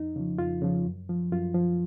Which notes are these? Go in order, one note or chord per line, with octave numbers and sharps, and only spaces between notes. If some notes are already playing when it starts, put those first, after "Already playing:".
Already playing: F2 D#4
C#3 F3
F2 F4
C#3 F3
F#2
F3
F#2 F4
F3